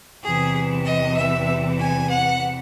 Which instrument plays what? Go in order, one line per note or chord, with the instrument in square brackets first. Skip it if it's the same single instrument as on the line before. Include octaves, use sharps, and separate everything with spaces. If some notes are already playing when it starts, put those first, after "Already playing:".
[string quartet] E2 C3 E3 G#4
D#5
E5
G#5
F#5